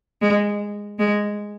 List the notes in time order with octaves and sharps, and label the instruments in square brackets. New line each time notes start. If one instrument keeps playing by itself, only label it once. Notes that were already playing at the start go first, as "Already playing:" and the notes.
[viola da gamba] G#3
G#3